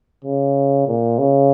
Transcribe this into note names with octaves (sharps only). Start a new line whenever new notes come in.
C#3
A#2
C#3